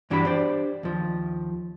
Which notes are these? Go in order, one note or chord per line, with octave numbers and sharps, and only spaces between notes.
G2 E3 D4 F#4 G4 B5
D4 G4 C5 D5
D#2 F3